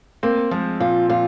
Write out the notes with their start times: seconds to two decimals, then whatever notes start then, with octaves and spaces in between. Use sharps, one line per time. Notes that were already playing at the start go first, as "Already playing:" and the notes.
0.23 A#3 C4
0.51 F3 G#3
0.80 A#2 F4
1.09 A#2 F4